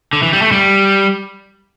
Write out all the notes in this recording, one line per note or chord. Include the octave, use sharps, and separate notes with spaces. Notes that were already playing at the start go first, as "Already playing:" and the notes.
D3
E3
G3
A3
G3